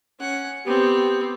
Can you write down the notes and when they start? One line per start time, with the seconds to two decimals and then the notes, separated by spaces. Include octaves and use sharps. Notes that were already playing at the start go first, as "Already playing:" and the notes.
0.19 C#4 F#5
0.65 B3 C4 G4